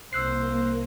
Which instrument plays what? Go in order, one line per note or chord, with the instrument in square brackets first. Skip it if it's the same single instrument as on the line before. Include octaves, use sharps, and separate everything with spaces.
[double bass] C2 [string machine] A#3 [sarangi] C5 [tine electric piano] E6 F#6 C7